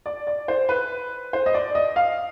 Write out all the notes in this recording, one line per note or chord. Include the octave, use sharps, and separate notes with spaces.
D5
D5
C5
B4
C5
D#5
D5
D#5
F5